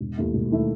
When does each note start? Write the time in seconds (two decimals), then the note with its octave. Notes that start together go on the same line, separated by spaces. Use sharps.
0.01 E1
0.17 D#2 D#3 A3 E4
0.34 E1
0.52 D#3 A3 E4